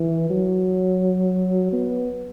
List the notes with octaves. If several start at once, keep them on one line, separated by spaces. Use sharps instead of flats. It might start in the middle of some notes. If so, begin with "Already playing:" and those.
Already playing: E3
F#3
B3